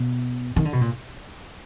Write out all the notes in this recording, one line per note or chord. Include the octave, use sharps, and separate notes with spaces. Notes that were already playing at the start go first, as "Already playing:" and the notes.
Already playing: B2
D#3
D3
B2
A#2